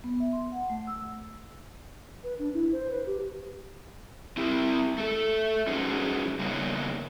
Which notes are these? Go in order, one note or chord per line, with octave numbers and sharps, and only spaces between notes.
B3
E5
C6
F#5
A3
E6
B4
D4
E4
C5
B4
G4
C4 E4 G4
A3 A4
C#4 D#4 F#4 G#4 B4 C5
C#3 G3 A#3 B3 D#4 C#5